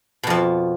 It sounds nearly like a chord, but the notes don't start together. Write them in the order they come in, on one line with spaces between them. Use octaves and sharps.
B2 F2 F3